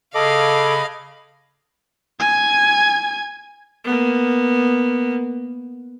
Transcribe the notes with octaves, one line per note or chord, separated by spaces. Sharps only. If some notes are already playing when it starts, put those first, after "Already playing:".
C#3 A4 D#5 F5 B5 D6
G#5 G#6
A#3 B3